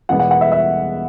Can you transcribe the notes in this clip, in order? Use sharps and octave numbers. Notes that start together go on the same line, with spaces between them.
E2 B2 G#3 B3 F#5
F#5
F#5
E5
E5